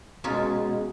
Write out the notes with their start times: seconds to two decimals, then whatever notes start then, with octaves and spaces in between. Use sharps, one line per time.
0.24 B2 G#3 C#4 D#4 F4